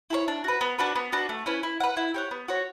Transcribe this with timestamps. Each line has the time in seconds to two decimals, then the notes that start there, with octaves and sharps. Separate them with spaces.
0.10 E4 A4 C#5
0.28 D4
0.44 F#4 B4
0.61 B3
0.78 D4 F#4 B4
0.96 B3
1.12 D4 F#4 B4
1.29 A3
1.46 C#4 E4 B4
1.63 E4
1.80 B4 F#5
1.97 E4
2.14 G4 C#5 F#5
2.31 B3
2.48 F#4 C#5